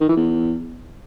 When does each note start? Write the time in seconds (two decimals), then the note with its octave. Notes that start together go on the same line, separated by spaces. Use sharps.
0.01 D#3
0.09 E3
0.16 E2